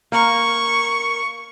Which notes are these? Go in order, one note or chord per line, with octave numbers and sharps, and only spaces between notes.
A#3 C#6